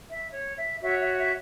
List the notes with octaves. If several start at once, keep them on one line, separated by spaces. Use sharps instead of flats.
E5
C#5
E5
F#4 C#5 E5
E5
E5